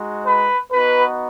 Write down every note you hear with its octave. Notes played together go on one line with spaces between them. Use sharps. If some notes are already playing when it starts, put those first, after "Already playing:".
Already playing: G#3 D#4 F#4
B4
B3 D#4 F#4 B4